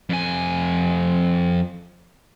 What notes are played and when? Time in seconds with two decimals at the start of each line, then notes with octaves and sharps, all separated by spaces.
0.09 F2 G#5